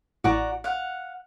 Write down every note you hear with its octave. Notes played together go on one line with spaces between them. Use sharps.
A1 A2 F#4 D5 A#5
F5 F#5